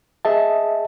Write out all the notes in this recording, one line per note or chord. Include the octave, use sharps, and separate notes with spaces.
G#4 D#5 E5 A5